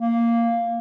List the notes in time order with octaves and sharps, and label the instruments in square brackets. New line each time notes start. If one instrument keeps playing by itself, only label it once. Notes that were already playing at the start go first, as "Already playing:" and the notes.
[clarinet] A#3